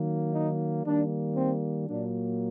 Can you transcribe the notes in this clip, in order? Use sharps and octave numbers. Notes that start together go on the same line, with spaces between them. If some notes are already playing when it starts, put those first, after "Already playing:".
Already playing: D#3 F#3 A#3
D#4
D#3 G3 A#3 D4
C4
A#2 F#3 A#3 D4